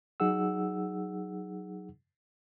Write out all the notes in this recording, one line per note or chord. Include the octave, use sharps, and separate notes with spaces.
F#3 D#4 G#4 F#5 E6